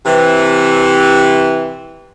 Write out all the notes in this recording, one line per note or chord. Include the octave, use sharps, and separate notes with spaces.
C3 E3